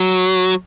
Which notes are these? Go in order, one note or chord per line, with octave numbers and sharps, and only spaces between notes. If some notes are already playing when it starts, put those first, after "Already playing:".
Already playing: F#3